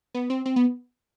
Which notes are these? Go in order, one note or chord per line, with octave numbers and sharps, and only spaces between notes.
B3
C4
C4
B3